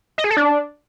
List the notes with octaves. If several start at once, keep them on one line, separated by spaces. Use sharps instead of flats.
D#5
G#4
A4
D4